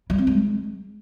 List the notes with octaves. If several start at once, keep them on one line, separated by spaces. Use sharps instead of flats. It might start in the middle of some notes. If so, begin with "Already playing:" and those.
G3
C4
G#3